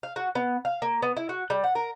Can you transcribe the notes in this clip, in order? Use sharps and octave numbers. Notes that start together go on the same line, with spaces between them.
F5
F#4
B3
F5
A#3
B3
E4
F#4
G3
F#5
A#4